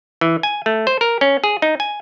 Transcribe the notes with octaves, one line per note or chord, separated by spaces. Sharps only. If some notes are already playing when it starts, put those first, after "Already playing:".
E3
G#5
A3
C5
A#4
C#4
G#4
D#4
G#5